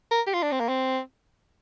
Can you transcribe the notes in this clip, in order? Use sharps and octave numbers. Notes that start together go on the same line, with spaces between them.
A#4
G4
F4
D4
C4
A#3
C4